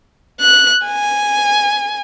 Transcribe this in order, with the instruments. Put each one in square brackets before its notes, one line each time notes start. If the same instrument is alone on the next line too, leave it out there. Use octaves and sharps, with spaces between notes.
[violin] F#6
G#5